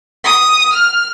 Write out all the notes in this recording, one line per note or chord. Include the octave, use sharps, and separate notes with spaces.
D#6
F6